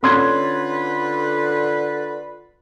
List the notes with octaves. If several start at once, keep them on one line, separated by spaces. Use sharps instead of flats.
D3 C#4 F4 B4 C6 G#6